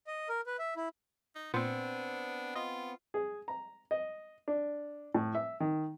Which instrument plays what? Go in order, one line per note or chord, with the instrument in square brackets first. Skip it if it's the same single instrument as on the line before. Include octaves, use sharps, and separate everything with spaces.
[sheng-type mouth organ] D#5
A#4
B4
E5
E4
[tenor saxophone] D#4
[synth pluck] A#2 C5 A5 [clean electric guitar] B3 C4 [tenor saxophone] D4
[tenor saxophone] F4 [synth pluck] D#5
[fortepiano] G#4
A#5
D#5
D4
A2
E5
D#3